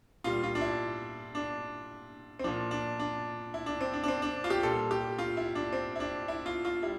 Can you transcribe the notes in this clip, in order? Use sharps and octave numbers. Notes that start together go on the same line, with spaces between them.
A#2 G3 F4
F4
D4
E4
D4
C4
A#2 F3 D4
D4
D4
E4
D4
C4
D4
D4
C4
D4
F4
G4
A#2 G3 A4
G4
F4
E4
D4
C4
E4
D4
E4
F4
F4
G3 E4